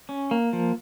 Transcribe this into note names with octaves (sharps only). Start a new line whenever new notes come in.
C#4
A#3
F3